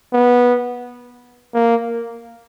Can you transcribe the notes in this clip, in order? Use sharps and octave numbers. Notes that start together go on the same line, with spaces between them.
B3
A#3